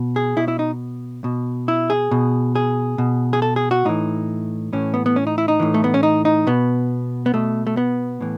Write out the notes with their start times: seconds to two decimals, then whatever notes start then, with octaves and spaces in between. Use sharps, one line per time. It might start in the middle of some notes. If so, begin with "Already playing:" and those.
Already playing: B2
0.16 G#4
0.37 B2 E4
0.48 E4
0.59 D#4
1.24 B2
1.68 E4
1.90 G#4
2.11 B2
2.56 G#4
2.98 B2
3.33 G#4
3.42 A4
3.56 G#4
3.71 F#4
3.85 A2 E3 D#4
4.73 A2 E3 C#4
4.94 B3
5.06 B3
5.16 C#4
5.27 D#4
5.38 E4
5.48 D#4
5.60 A2 E3
5.74 A3
5.84 B3
5.94 C#4
6.03 D#4
6.25 D#4
6.47 B2 B3
7.26 B3
7.34 B2 A3
7.67 A3
7.77 B3
8.21 A2 E3